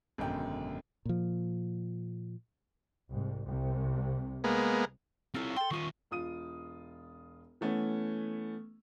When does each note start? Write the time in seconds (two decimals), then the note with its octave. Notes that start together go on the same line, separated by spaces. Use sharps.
0.18 G#1 F#2 B2 D3 G5
1.05 A#2 F3
3.11 C2 G#2
3.46 C2 C3
4.44 G#3 A#3 B3
5.34 C4 E4 F4 A4 C#5
5.56 A4 G5 C6
5.71 D#3 F4 C#6 D#6
6.11 E1 F4 D#6 D#7
7.61 E3 A3 B3 C#4